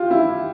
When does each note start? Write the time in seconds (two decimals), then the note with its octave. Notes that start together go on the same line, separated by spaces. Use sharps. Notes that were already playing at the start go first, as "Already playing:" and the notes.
Already playing: F4 G4
0.11 E4